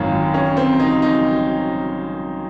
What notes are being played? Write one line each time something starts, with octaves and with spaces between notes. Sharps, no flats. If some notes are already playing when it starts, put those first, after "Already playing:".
Already playing: G#1 F#2 D#3 F#3 F4
C#4
C4
D#4
D#4